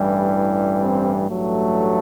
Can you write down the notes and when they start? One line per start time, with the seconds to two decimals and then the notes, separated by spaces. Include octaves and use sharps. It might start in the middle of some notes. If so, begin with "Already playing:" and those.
Already playing: A1 G2 E3 G3
0.82 C4
1.28 A1 G2 F#3 A3